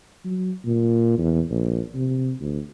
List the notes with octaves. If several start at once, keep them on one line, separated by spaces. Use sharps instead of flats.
F#3
A#2
E2
A#1
C3
D2